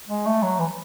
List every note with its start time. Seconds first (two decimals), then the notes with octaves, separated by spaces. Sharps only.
0.08 G#3
0.26 A3
0.43 F#3
0.59 E3